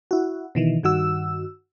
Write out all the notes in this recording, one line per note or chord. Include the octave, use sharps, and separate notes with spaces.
E4 F#4
B2 D#3 E3
G2 D#3 F#4 E6